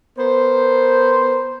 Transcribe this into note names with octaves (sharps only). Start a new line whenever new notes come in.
B3 A#4 C5